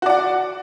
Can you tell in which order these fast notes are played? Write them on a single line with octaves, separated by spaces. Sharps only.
F#4 D5 F#5